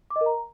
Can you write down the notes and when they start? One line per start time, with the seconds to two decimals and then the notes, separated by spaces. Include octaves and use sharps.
0.10 D6
0.16 D#5
0.21 A#4
0.26 A#5